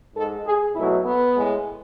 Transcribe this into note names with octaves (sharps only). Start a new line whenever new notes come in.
G#2 G#3 A4
G#4
B2 F#3 A3 E4
B3
A2 G#3